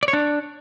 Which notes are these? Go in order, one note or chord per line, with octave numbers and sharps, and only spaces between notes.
D5
C#5
D4